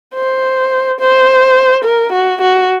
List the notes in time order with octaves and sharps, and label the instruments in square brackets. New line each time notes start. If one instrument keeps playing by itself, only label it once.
[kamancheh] C5
C5
A#4
F#4
F#4